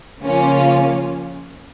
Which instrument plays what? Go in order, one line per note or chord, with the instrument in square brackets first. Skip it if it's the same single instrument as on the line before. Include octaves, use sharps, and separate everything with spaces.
[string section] C#3 F3 A#3 C#4 F4